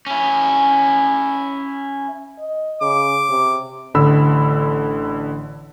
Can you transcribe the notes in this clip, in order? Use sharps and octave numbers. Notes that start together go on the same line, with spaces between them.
C#4 E4
D#5
C#3 D6
C3
A1 D3 B5 E6